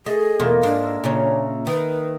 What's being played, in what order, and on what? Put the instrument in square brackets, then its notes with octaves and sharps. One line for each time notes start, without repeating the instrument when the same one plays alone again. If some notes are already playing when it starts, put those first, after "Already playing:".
[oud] A3 [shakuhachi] G#4 [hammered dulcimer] D#5
[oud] E2 B2 A3 [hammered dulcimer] A#3 F4
[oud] G#2 [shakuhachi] D4
[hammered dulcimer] E5
[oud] A#2 C#3 C#4 [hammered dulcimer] A#5
[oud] D#3 [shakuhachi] B4